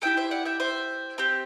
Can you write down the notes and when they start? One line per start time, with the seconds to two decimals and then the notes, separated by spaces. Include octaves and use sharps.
0.02 A3 E4 G4 E5 G5
0.17 C5 E5
0.31 D5 F#5
0.45 E5 G5
0.60 C5 E5
1.18 C4 G4